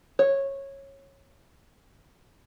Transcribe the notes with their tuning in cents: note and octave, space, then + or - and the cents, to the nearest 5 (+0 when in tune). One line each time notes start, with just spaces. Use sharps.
C#5 -15